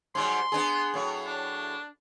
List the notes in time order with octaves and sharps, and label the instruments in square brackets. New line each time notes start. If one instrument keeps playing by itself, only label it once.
[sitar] G#2 F#3 G3 [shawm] C6
[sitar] B3 D4 G#4
A2 F#3
[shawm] D4